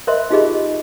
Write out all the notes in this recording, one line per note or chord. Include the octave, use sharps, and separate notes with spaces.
A#4 C5 D#5 E5 B5 C6
D#4 F4 G4 G#4 D#5 B5